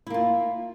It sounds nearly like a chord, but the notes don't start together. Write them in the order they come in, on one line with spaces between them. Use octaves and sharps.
E4 A#3 F4